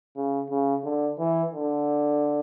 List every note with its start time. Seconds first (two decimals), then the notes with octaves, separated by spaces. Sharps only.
0.16 C#3
0.50 C#3
0.84 D3
1.19 E3
1.53 D3